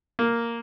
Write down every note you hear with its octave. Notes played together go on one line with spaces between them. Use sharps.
A#3